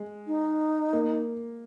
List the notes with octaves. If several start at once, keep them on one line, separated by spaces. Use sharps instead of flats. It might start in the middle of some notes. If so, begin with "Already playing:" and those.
Already playing: G#3
D#4
A#3